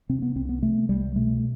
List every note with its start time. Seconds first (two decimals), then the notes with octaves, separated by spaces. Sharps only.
0.09 C3 C4
0.22 B3
0.36 C2 C4
0.49 B3
0.62 C3 A3
0.89 C2 G3
1.15 B2 A3